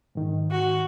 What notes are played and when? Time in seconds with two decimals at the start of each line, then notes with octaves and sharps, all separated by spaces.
0.15 G#2 D#3
0.52 F#4